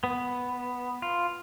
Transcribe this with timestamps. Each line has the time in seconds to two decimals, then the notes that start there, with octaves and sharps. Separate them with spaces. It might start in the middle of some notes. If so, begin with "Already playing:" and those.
0.04 B3
1.02 F4